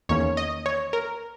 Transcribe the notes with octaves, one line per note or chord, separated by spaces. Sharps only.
E2 D#3 A#3 C#4 C#5
D#5
C#5
A#4